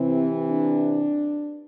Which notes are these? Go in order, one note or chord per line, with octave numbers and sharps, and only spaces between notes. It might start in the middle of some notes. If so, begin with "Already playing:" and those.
Already playing: C3 E3 C4
D4